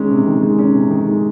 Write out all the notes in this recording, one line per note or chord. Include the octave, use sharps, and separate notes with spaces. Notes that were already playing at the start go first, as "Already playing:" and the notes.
Already playing: D#3 G#3 C#4
C3
D#3
G#3
C#4
C3
D#3
G#3